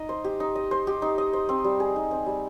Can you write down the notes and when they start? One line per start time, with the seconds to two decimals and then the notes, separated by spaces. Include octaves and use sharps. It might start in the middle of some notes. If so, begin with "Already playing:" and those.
Already playing: D#4 D#5
0.09 C5
0.24 G4
0.40 D#4
0.56 D#5
0.71 C5
0.87 G4
1.02 D#4
1.18 D#5
1.33 C5
1.49 C4
1.64 G3
1.80 G#4
1.96 D#4
2.11 C4
2.26 G3